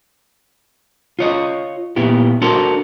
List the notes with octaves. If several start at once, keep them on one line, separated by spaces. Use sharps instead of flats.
F4 C#5 D#5
A#2 B3 E4 G4
D4 F#4 A4 A#4 C5